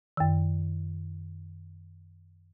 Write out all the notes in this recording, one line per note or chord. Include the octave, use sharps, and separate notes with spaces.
F#2 D#3